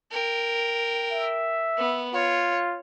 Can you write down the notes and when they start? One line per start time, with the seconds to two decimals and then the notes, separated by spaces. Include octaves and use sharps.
0.12 A#4 G5
1.11 E5
1.77 B3
2.13 F4 C#5